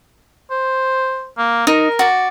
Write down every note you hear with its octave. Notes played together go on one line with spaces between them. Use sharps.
C5
A#3
D#4 A#4
F#4 D5